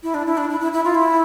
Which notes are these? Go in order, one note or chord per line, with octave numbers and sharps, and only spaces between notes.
E4
D4
E4
D4
E4
E4
E4
F4
E4